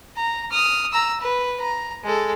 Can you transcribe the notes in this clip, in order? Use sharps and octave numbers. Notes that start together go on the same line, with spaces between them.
A#5
D#6 F6
A#5 E6
B4
A#5
G#3 A4